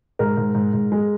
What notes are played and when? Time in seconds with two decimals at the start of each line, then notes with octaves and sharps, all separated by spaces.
0.19 G#2 A#4
0.37 G#2
0.54 G#2
0.73 G#2
0.92 G#3